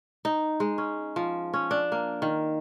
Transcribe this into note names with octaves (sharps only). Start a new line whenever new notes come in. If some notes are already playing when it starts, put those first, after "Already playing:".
D#4
G#3
C#4
F3
C#4
D4
A#3
D#3